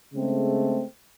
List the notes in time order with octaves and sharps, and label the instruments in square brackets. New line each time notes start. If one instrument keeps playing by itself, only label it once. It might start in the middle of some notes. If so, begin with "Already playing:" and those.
[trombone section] C#3 G#3 A3 C4